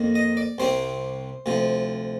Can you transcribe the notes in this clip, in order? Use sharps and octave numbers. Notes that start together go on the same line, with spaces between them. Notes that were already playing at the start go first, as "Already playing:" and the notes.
Already playing: F2 D#3 A#3
D#5
D5
C2 C3 G3 C4 C5
D2 C3 F3